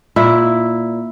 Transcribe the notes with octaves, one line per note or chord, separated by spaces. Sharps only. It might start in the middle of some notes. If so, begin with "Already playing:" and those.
A#2 E4